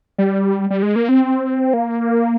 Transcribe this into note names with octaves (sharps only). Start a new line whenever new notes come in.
G3
G3
G#3
A#3
C4
A#3